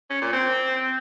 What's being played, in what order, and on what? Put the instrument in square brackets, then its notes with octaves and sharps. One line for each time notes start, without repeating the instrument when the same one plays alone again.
[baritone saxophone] C#4
A#2
C4